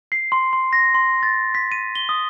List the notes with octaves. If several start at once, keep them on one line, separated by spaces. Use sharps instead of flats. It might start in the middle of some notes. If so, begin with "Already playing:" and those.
C7
C6
C6
A#6
C6
A6
B6
D#7
G7
D#6